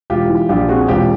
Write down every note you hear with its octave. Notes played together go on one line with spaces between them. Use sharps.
E1 F4 G4
E3
A#1 F4 G4
C4 F#4 G#4
E1 F4 G4